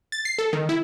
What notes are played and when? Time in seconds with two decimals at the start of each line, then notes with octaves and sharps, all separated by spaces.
0.12 A6
0.25 C7
0.38 A4
0.53 D#3
0.69 E4